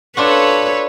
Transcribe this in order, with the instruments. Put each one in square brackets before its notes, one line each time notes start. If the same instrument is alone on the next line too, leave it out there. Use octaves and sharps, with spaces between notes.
[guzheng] D4 F4 F#4 [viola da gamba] A4 B4 C#5